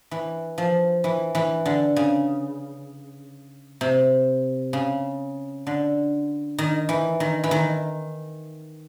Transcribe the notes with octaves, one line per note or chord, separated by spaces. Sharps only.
E3
F3
E3
E3
D3
C#3
C3
C#3
D3
D#3
E3
D#3
E3
D#3